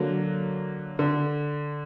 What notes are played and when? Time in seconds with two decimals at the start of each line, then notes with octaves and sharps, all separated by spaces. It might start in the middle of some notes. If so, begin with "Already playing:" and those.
Already playing: D3 F#3 A#3
0.99 D3